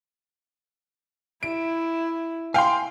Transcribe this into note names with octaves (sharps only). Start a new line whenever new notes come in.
E4 D7
F5 G5 G#5 C6